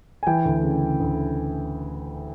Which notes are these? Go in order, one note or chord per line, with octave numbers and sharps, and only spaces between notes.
G#5
E3 G5
D2
C#3
C#3
D2